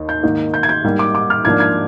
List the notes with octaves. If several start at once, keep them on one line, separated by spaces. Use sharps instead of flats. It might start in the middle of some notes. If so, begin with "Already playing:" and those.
Already playing: D#2 D#4
G6
G#2 D#3 A#3 D#4
G6
G#6
G6
G#2 G3 A#3
D6
D6
F6
G#2 F3 A#3 D4 G#6
G#6